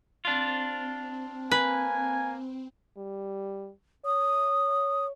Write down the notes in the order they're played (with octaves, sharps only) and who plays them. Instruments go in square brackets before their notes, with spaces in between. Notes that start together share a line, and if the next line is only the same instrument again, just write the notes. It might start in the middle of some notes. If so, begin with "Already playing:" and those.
[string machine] C4 [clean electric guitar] D4 F4
[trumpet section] A#3 G#5 [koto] B4
[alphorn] G3
[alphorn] C#5 [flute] D#6